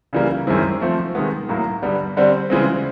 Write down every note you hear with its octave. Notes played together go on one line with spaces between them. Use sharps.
C#3 E3 G3 A#3
F#2 D#3 G#3 C4 E4
F3 A3 C4
C3 D#3 G#3 B3
A2 F#3 A#3
G2 D3 G3 B3
D3 G3 C4
C#3 E3 G#3 C4